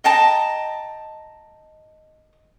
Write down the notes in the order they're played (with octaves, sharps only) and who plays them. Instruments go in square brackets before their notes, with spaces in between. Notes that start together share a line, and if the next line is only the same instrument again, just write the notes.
[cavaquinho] D#5 G5 A5 A#5